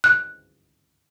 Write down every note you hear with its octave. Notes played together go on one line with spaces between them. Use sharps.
F#6